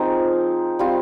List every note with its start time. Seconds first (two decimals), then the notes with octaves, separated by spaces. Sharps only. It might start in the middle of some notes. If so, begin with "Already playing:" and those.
Already playing: F3 C4 D#4 G#4 A#4 C5
0.79 G3 C4 F4